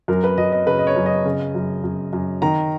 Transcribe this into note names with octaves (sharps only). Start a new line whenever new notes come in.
F#2 A#4
B4
F#2 D#5
D#5
C#3 B4
D#5
C#5
F#2
D#5
C#3
F#2
F#2
F#2
D#3 A#5